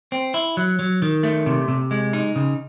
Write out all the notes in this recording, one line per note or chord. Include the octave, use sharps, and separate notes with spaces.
C4
E4
F#3
F#3
D#3
A3
C3
C3
G#3
D#4
C#3